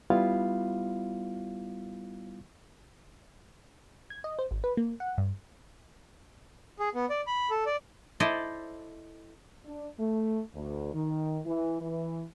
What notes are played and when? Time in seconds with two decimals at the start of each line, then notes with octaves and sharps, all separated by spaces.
0.10 G3 B3 E4 F4 F5
4.10 G#6
4.24 D#5
4.39 C5
4.51 G#1
4.64 B4
4.77 A#3
5.00 F#5
5.18 G2
6.79 G#4
6.95 B3
7.10 D5
7.27 B5
7.50 A4
7.66 D5
8.20 E4 A4 C5 D5 D#5
9.65 D4
9.99 A3
10.54 D2
10.93 D#3
11.45 E3
11.81 E3